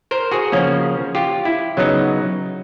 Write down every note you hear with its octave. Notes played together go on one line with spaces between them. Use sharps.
A#4 C5
F#4 G#4
C#3 F3 A#3 C#4
F4 G4
E4
C#3 F#3 B3 D#4